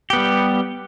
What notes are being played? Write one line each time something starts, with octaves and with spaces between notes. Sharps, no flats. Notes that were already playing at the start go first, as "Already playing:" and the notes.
G3 B3 G4